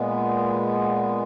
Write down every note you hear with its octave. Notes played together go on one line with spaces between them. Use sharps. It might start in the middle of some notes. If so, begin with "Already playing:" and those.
Already playing: A#2 G#3 B3